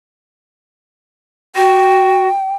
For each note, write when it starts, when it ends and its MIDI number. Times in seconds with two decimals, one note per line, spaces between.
1.56 2.28 66
1.56 2.55 79